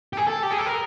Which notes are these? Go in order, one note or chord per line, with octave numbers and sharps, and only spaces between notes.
G4
G#4
A4
G4
G#4
A4
A#4